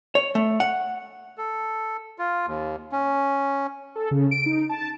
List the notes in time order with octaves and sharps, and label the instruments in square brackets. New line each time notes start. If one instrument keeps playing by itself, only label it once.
[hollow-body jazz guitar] C#5
A3
F#5
[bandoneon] A4
F4
D#2
C#4
[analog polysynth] A4
C#3
D7
D#4
A5